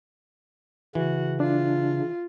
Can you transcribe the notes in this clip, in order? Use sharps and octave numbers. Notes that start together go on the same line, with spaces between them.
C#3 E3 F#4
D4 F4